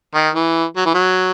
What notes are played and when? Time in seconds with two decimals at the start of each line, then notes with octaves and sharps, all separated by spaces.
0.14 D#3
0.35 E3
0.76 F#3
0.85 E3
0.94 F#3